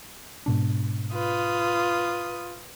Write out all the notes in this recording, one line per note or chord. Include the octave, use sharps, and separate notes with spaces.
G#2 B2 D4
F4 B4 D#6